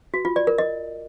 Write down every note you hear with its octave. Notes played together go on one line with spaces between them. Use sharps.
F#4
F4
D5
A#4
D#5